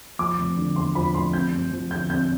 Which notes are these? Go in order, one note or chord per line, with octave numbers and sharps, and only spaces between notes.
F3 D6
F1
D3
E2 C6
F3 B5
F1 C6
C4 G6
G2
F3
D3 G6
C4 G6